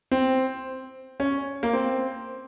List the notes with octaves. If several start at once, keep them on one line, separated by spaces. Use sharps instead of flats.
C4
C#4
A#3
C4